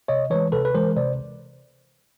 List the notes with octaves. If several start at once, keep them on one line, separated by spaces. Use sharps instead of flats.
C3 C#5 D#5
E3 G#3 B4 C#5
C3 A4 B4
B4
E3 G#3 A#4 C5
C3 C5 D5